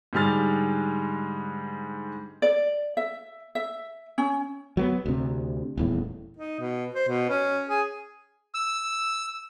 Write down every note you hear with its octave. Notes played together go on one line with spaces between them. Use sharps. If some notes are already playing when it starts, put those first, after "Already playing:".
G#2 D3 G3 G#3 F6 A6
D5
E5
E5
C#4
F#3 A#3 B3
D2 C3
D#1 E2 A2
D#4
B2
C5
B2
C#4
G#4
E6